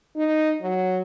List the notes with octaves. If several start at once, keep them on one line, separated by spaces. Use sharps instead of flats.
D#4
F#3